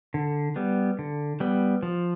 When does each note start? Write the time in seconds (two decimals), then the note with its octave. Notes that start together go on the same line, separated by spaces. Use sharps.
0.14 D3
0.56 G3 B3
0.99 D3
1.40 G3 B3
1.83 F3